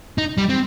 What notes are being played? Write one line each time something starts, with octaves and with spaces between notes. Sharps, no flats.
D#4
G3
C4